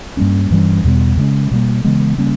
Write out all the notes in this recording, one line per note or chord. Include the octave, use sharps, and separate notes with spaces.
G2 G3 A#3 C#4
G2 E3 G3 C#4
E2 B2 G3 B3
C#3 G#3 C#4
B2 G3 A#3
C#3 E3 G#3 B3
C#3 G3 A#3 C#4